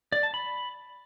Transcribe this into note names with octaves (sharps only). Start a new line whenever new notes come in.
D5
A5
B5